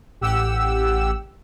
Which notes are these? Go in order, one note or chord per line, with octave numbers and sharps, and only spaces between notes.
A1 G4 F#5 E6